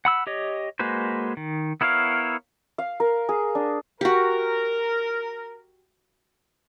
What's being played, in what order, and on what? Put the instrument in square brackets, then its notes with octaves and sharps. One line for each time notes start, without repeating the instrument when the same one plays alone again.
[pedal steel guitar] F#5 B5 E6
G4 C#5 D#5
G#3 A#3 F#4 B4 C5
D#3
B3 E4 A#4 C#5 F5
[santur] F5
A#4
G#4
D4
[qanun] F#4 G4 [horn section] A#4